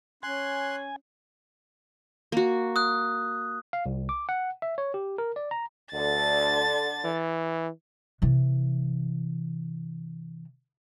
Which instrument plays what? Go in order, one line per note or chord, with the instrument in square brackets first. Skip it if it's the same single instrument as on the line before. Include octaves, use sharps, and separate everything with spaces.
[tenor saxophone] C#4 [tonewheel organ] G#5 [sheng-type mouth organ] C6 F#6
[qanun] A#3 F#4
[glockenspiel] D#6 F#6
[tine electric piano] F5
C2
D6
F#5
E5
C#5
G4
A#4
D5
A#5
[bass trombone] D2 [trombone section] D3 [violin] A6
[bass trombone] E3
[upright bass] C3 E3